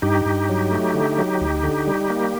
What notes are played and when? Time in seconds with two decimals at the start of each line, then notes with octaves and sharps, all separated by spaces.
0.02 G2 D#4 G4
0.26 G2
0.49 F#3
0.71 A3
0.94 D3
1.18 F#3
1.41 D2
1.63 D3
1.87 G3
2.10 A#3